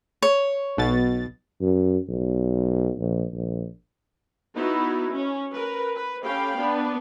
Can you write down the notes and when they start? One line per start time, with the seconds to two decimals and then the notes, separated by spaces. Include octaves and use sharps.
0.22 C#5
0.77 B1 B2 A6
1.61 F#2
2.09 B1
2.98 A#1
3.33 A#1
4.56 B3 D#4 E4 F#4 B4
5.11 C#4
5.53 A#4 B4
5.95 B4
6.24 C#4 G4 A4 F5 G5 B5
6.59 B3 D4 B4